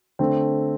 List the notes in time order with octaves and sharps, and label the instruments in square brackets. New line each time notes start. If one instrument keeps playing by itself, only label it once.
[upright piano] D3 A3 C4